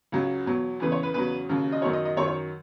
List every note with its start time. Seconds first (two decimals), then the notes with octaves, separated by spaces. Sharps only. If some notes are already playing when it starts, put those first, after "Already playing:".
0.12 C#2 C#3 F#3
0.46 E2 B2 F#3
0.80 E2 C#3 E3 B4
0.92 C#5
1.03 B4
1.14 E2 C#3 F#3 B4
1.49 D#2 C#3 F#3
1.72 D#5
1.82 F#2 D#3 F#3 C#5
1.93 D#5
2.05 D#5
2.17 F#2 D#3 F#3 C#5
2.28 C#5